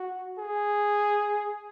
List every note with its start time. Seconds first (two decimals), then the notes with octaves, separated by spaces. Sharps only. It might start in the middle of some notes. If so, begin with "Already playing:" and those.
Already playing: F#4
0.39 G#4